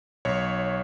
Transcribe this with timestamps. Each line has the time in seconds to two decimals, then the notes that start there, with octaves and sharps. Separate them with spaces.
0.25 B1 C#5